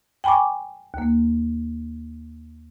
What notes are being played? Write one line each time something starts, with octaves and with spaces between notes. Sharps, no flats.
G5 G#5 B5 C#6 D6
D#2 A#3